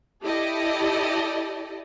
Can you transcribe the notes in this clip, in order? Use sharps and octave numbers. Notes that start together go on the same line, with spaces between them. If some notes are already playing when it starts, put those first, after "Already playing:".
E4 G4 A4 D5 D#5